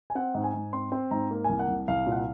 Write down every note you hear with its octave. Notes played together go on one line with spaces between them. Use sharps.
G#5
C4 F#5
G#2
G#5
G#2
C4 C6
C4 C6
G#2 A#5
A#3
C2 G#5
F#5
C2
C2 F5
A#2
F#5
F5